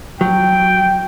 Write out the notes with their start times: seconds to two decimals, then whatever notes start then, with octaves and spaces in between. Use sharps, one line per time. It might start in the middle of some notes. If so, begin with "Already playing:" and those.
0.21 F#3 G5